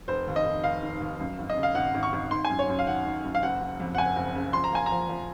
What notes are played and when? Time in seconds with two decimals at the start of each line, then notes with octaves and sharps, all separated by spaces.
0.08 F1 C5
0.27 D#2
0.36 D#5
0.45 F1
0.64 F1 F5
0.82 D#3
1.01 D#2
1.20 F#2
1.39 G#1
1.50 D#5
1.57 C#3
1.63 F5
1.75 G#1 F#5
1.94 G#1
2.03 C#6
2.13 G#1
2.31 D#3 C6
2.45 G#5
2.50 F#2
2.59 C#5
2.68 F#2
2.79 F5
2.87 D#3 F#5
3.05 D#3
3.24 F#2
3.35 F5
3.43 F#1 F#5
3.61 F#1
3.80 F2
3.95 F#5
3.98 F#1 G#5
4.16 F#1
4.35 C#3
4.53 F3 C6
4.64 A#5
4.72 A#3 G#5
4.86 F3 A#5
5.09 F3